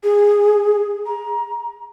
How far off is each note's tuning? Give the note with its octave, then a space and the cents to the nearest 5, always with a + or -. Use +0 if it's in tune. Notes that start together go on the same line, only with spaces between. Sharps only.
G#4 -10
A#5 +25